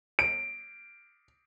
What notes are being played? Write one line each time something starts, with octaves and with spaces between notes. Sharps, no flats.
D7